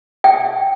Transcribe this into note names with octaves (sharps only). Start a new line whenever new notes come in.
G5